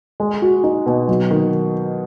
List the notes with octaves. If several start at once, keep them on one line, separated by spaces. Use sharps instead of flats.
G#3
F#4
D#4
B2
F#3
D#3